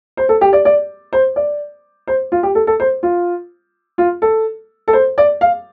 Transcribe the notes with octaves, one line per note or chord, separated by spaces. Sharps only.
C5
A4
G4
D5
D5
C5
D5
C5
F4
G4
A4
A4
C5
F4
F4
A4
A4
C5
D5
F5